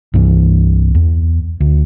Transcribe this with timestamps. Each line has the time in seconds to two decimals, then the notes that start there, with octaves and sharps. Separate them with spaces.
0.14 C2 G2 E3
0.95 E2
1.60 D2